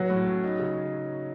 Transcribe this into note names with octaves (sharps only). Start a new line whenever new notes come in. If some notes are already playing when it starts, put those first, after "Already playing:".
Already playing: F#3 F#4
A2
C#4
D#4
C#3